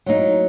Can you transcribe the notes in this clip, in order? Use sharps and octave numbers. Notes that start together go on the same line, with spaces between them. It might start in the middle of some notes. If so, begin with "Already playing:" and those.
F#3 A#3 D#4